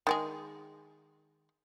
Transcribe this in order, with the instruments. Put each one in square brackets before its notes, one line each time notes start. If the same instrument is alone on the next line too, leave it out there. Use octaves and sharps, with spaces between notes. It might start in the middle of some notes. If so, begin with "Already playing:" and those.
[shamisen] D#3 G#3 G#4